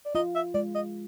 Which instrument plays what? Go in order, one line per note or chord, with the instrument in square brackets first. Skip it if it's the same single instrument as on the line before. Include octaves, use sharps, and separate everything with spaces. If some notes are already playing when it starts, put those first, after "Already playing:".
[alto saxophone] D5
[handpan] F4 [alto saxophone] D#5
[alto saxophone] E5
[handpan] G#3 [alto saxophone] D5
[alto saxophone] D#5